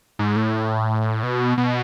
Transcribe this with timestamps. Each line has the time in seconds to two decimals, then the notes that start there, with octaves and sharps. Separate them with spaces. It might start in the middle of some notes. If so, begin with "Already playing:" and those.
0.19 G#2
0.36 A2
1.23 B2
1.58 B2